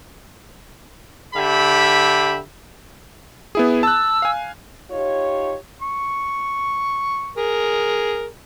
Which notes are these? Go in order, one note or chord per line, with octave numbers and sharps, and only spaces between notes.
D3 G4 E5 B5
B3 E4 G#4
A5 E6 F#6
F5 G#5
D#4 F4 G4 C#5
C#6
G#4 A#4